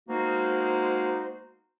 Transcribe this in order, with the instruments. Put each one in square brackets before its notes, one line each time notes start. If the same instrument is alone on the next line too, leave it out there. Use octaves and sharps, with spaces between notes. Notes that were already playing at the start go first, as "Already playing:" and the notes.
[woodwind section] G#3 A#3 B3 D#4 F#4 C5